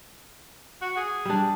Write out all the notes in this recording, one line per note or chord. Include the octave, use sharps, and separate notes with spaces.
F#4
G#4
G3 D4